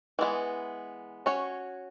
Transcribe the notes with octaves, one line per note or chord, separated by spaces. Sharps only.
E3 G#3 B3
C#4 F#4 C#5